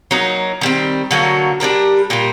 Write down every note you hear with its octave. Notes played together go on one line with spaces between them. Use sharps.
F#3 A#3 D#4
D#3 G3 C4
D3 F#3 A#3 F#4
G3 D4 G4 A#4
A#2 G3 A#3